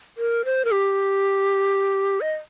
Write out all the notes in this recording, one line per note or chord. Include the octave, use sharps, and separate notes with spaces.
A#4
C5
A#4
G4
D#5